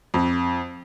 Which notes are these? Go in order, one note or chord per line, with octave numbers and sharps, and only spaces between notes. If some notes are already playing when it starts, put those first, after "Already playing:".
F2